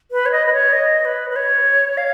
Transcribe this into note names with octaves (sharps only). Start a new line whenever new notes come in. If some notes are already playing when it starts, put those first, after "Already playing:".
B4
C#5
D#5
B4
C#5
D#5
B4
B4
C#5
F5